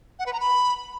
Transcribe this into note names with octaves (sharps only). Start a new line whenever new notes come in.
F#5
B4
A#5
B5